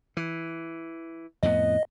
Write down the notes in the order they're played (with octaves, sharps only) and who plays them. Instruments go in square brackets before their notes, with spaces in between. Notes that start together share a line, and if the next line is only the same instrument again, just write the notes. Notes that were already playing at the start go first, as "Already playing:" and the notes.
[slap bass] E3
[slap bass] F2 A2 B3 [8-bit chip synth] D#5